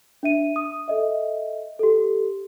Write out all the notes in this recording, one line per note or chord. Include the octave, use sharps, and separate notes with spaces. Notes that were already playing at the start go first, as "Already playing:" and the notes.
D4 E5 D#7
D#6
A4 D#5 E5
G4 A4